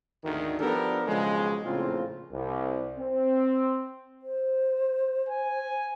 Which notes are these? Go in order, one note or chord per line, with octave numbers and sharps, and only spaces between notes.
G#1 D2 D#3
F3 B3 D4 G4 A4 A#4
B1 C#3 F3 G#3
A#1 A2 C#3 A#3 C4 F4
C2
C4
C5
G#5